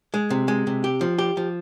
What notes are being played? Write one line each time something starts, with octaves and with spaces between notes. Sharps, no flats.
G#3
C3
G#3
C3
G4
F3
G4
F3